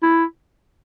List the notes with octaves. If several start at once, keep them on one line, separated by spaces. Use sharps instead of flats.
E4